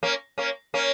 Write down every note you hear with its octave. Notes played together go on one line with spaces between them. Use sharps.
A#3 C#4
A#3 C#4
A#3 C#4